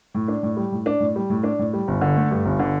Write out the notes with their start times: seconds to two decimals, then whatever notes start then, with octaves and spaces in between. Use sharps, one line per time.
0.14 A2
0.28 D4
0.43 A2
0.57 G3
0.72 A2
0.86 D4
1.00 A2
1.16 G3
1.30 A2
1.43 D4
1.59 A2
1.73 G3
1.88 G1
2.01 D3
2.17 A3
2.31 G2
2.45 G1
2.59 D3